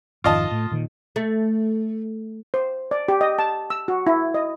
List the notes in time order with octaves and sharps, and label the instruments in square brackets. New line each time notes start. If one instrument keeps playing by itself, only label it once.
[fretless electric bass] G#1 F2 D#3 [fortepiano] F4 D#5 A5
[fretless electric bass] A2
A#2 D#3
[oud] A3
[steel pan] C5
D5
G4
D#5
A5
E6
F#4
E4
D#5